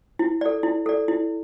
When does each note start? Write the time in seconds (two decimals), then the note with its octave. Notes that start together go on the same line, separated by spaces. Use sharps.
0.19 E4
0.41 A4 D5
0.63 E4
0.86 A4 D5
1.08 E4